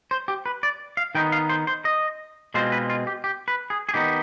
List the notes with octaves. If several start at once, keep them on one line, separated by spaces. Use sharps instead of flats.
C5
G4
B4
D5
F5
D#3 B3 D#4 G5
F5
C5
C5
D#5
B2 G#3 C4 F4 C5
B4
F4
G4
G4
B4
G#4
G#4
D#3 B3 D#4 G4